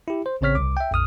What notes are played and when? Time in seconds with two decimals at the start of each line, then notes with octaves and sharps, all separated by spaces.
0.08 E4 G4
0.26 C5
0.41 A1 C#3 C4 C#5 F6 B6
0.55 C2 D6
0.77 E5 G5
0.91 A#1 F2 D#6 F6